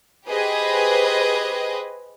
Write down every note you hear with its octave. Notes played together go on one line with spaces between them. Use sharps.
G4 G#4 B4 C5 D#5